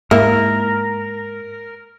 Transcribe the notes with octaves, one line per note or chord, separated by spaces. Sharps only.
G#2 A#3 E4 A#4